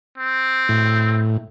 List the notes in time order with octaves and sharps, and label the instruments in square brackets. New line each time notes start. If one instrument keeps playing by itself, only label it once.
[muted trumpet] C4
[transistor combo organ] A2